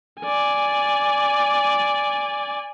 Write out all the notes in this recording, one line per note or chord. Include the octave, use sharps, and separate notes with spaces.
D5 G#5